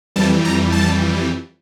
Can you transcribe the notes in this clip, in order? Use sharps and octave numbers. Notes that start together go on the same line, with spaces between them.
F2 E3 G3 A5
A#5
A5